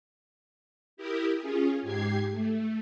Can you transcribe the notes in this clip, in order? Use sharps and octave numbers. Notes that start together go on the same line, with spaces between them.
E4 G4 A#4 D#6
C#4 F4 G#4
G#2 G4 G#6 C7
A3